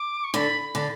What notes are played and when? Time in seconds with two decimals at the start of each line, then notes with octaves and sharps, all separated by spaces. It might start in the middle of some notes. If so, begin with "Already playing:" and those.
Already playing: D6
0.24 C#6
0.34 D3 B5
0.61 B5
0.75 D3